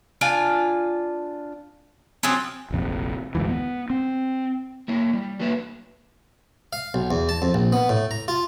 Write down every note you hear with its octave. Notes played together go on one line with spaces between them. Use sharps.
D4 F4 G#5
F3 F#3 C4 C#4
F1 A#1 F2
F#1 D2 G#2 E3
B3
C4
A#3 E4 C#5
G3
F#3 A3 A#3 B4 C#5 E5
F5
B1
E2
A5
F2
A#1
B3
A2
A#5
F4